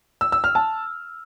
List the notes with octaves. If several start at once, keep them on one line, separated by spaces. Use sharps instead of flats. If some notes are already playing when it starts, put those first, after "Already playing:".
E6
E6
F6
A5